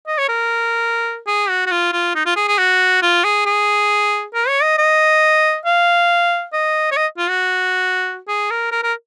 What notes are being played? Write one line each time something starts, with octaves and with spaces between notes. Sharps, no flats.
D#5
C#5
A#4
G#4
F#4
F#4
F4
F4
D#4
F4
G#4
G#4
F#4
F4
G#4
G#4
A#4
C#5
D#5
D#5
F5
D#5
C#5
D#5
F4
F#4
G#4
A#4
A#4
A#4